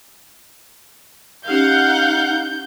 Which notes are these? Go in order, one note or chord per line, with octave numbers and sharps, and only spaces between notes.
C#4 D#4 G4 F5 F#5 G6